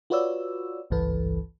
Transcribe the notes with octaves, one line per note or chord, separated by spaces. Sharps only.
F4 F#4 B4 C#5 D5 E6
G#1 C#2 G2 E3 A4 B4